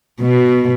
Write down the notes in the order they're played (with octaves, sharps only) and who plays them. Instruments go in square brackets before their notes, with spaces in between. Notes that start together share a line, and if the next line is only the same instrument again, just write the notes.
[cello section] B2